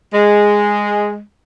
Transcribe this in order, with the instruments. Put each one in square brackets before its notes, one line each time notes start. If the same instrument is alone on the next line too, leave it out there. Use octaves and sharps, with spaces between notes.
[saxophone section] G#3